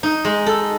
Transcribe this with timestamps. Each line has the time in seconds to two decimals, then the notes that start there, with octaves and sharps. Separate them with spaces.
0.03 D#4
0.25 G#3
0.46 A4